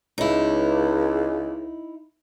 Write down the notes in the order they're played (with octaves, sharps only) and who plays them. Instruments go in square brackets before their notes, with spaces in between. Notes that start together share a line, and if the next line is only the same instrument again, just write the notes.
[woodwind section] C#2 [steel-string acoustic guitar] D#4 E4